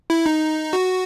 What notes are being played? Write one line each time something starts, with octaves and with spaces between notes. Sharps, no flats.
E4
D#4
F#4